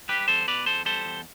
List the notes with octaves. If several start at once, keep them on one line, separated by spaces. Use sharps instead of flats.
G3 G4 B4
E2 A4 C5
B2 B4 D5
E2 A4 C5
G3 A4 C5
E2